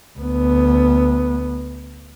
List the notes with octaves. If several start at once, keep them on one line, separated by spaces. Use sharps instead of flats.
D2 B3